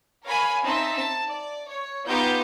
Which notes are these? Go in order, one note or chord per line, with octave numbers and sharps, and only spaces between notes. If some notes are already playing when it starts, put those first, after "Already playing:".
A#4 C#5 F5 G#5 B5
C4 D#4 E5 A5 B6
A5
D5
C#5
B3 D#4 F4 G4 G6